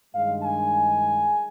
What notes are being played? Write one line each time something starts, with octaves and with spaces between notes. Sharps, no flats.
G2 D#3 G#3 F5
G#5